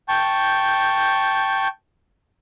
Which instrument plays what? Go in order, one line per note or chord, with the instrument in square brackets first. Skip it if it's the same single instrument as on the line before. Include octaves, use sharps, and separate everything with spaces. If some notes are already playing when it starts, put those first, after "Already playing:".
[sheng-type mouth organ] G5 A5 C#6 G6